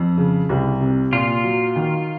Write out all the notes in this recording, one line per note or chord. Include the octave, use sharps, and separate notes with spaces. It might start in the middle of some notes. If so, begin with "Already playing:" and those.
Already playing: F2
C#3
C2
C3
A#2 F4
F#3
D#3